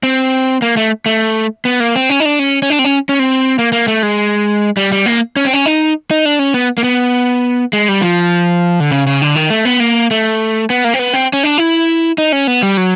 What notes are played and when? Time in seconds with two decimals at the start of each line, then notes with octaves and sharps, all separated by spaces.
0.03 C4
0.62 A#3
0.77 A3
1.06 A3
1.65 B3
1.80 A#3
1.96 C4
2.09 C#4
2.20 D#4
2.25 D4
2.39 C#4
2.62 C#4
2.70 D4
2.79 C4
2.84 C#4
3.09 C#4
3.19 C4
3.59 A#3
3.72 A#3
3.88 A3
4.03 G#3
4.77 G3
4.92 G3
5.06 A#3
5.36 C#4
5.45 C4
5.53 C#4
5.66 D#4
6.11 D#4
6.25 D4
6.39 C#4
6.54 B3
6.78 A#3
6.84 B3
7.73 G#3
7.88 G3
8.02 F3
8.80 D3
8.91 C#3
9.07 C#3
9.22 D3
9.35 D#3
9.50 A3
9.65 B3
9.80 A#3
10.11 A3
10.70 B3
10.84 A#3
10.94 C4
10.99 B3
11.14 C4
11.33 C#4
11.43 D4
11.58 E4
12.18 D#4
12.32 C#4
12.47 B3
12.63 G3
12.77 F#3